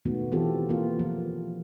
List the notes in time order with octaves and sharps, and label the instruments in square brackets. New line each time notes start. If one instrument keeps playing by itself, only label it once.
[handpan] B2 D#3 A3 B3 F#4
E3 B3 C4 F4 G4 A4
A#3 B3 E4 F4 A#4
F3